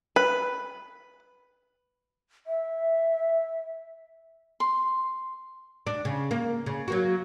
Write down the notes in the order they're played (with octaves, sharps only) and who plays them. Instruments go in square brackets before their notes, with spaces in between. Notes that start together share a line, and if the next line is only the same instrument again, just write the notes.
[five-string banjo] B4
[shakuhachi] E5
[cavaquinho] C6
[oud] D4
C#3
A#3
C#3
F#3 A#3 F#4